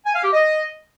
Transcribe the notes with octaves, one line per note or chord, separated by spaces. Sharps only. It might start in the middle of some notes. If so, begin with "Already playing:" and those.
G#5
F5
G4
D#5